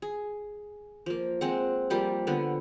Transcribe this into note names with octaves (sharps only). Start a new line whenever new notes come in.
G#4
F3 A#3
G#3 C4 F#5
F3 G3 A#3
D3 F3 B3